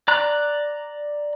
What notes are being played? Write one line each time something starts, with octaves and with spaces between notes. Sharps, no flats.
D5 A#5 F#6